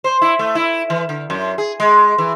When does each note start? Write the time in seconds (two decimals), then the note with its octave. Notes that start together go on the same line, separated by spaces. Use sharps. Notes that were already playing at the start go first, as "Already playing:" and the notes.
0.04 C5
0.22 E4
0.39 A3
0.55 E4
0.90 E3
1.09 D3
1.30 F#2
1.58 G#4
1.80 G#3
2.18 E3